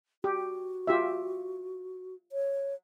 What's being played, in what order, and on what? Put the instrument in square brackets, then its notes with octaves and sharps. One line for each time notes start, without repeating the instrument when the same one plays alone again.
[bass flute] F#4 [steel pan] G4
[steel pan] F4 G4 E5
[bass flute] C#5